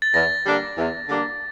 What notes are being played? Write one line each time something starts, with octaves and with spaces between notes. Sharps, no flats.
A6
E2 A#6
D3 G3 A#3 D4
E2
D3 G3 A#3 D4